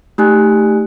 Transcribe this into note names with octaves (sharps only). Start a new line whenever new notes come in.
A3 D#4 G4 G#5 F#6